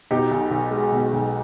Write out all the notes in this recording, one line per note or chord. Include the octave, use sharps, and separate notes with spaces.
B2 D#4 G4
B1
B1
G#3
B2
B1